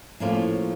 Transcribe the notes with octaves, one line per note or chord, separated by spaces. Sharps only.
A2 F3 A#3 C#4 F4